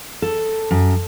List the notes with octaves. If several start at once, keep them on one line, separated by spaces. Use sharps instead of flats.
A4
F#2